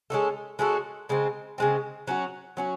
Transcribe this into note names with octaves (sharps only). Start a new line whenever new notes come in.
G#3 C#4 F#4 A4
G#3 C#4 F#4 A4
C#3 G#3 C4
C#3 G#3 C4
F#3 C#4 F#4
F#3 C#4 F#4